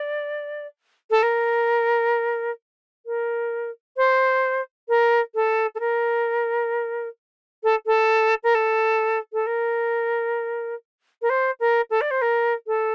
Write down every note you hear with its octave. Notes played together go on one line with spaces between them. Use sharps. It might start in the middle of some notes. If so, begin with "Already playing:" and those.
Already playing: D5
A4
A#4
A#4
C5
A#4
A4
A4
A#4
A4
A4
A#4
A4
A4
A#4
A#4
C5
A#4
A4
D5
C5
A#4
A4